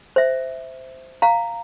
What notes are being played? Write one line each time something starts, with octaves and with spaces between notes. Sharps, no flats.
C5 E5
F5 A#5